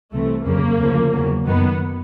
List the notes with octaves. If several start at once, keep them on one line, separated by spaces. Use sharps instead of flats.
C2 C3 E3 A3
F2 C#3 F#3 A#3
D2 C#3 F3
E2 C#3 F#3
F#2 D#3 F#3 B3